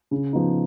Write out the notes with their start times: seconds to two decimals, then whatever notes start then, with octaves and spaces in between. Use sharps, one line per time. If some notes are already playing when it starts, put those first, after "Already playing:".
0.11 C#3
0.33 F3 B3 D#4